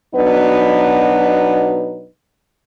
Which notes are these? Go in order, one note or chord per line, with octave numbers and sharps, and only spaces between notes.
B2 F#3 B3 D4 D#4 B4